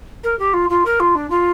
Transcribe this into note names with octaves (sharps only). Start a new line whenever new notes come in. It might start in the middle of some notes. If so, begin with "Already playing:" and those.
A#4
G4
F4
F4
A#4
F4
D4
F4